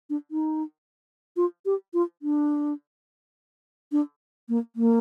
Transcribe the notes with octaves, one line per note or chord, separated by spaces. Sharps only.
D4
D#4
F4
G4
F4
D4
D4
A#3
A#3